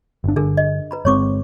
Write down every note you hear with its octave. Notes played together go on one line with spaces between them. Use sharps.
G1 D4
G1 D3 D4 G#4 A#4
D#5
B4 A#5 B5
G1 G#3 C4 C#5 C#6 D6